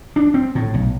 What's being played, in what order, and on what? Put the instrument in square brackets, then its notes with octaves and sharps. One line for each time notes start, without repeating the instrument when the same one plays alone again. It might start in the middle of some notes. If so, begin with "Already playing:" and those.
[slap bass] D4
C4
A2
B1